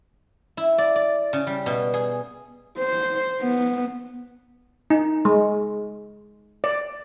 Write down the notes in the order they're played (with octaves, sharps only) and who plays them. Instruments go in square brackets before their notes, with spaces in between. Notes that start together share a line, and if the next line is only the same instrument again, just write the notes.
[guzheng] E4
D5
D5
C#3
G3
B2
G#4
[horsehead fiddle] C5
B3
[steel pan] D#4
G#3
D5